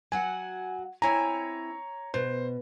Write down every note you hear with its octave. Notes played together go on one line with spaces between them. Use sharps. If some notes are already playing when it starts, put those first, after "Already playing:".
F#3 F#4 F#5 G#5
C4 E4 C#5 G#5 A#5
B2 C5